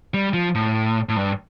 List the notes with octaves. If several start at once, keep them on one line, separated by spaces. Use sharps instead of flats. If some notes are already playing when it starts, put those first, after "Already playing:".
G3
F3
A2
A2
G2